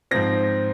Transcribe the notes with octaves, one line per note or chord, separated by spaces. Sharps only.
G#2 F3 C4 A#6